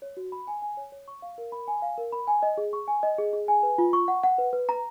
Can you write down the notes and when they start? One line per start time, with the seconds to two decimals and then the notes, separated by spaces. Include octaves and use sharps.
0.02 C#5
0.17 F#4
0.32 B5
0.47 G#5
0.62 G#5
0.77 C#5
0.92 C#5
1.08 C#6
1.22 F5
1.38 A#4
1.52 B5
1.68 G#5
1.82 F5
1.98 A#4
2.12 B5
2.27 G#5
2.43 D#5
2.58 G#4
2.73 C#6
2.88 G#5
3.03 D#5
3.18 G#4
3.33 G#4
3.48 G#5
3.63 B4
3.78 F4
3.93 C#6
4.08 F#5
4.23 F#5
4.38 B4
4.53 B4
4.69 A#5